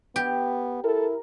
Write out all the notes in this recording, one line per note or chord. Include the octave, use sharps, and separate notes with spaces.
B3 G4
E4 A4 A#4